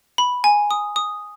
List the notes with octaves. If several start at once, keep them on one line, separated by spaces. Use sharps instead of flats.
B5
G#5
D#6
D#6